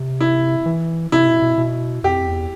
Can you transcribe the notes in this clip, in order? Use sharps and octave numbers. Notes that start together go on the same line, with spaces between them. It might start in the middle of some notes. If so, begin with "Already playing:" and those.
Already playing: C3
E4
E3
C3 E4
B2
B2
B2
F2 G4
E2